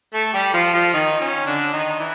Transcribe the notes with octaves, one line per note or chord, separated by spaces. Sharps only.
A3 A4
G3 G4
F3 F4
F3 F4
D#3 D#4
C#4
D3 D4
D#3 D#4
E3 E4